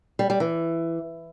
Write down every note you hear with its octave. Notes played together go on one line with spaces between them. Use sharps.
G3
G3
E3